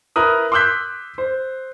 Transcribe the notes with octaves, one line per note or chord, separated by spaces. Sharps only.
E4 A#4 B4 D#6
C6 D6 E6 F#6 G6 B6
C5